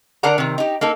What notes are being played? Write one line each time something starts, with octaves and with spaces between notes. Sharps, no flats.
D3 D4 A#4 D5 F#5 A#5
C3 D#3
D#4 G4
A#3 D#4 A4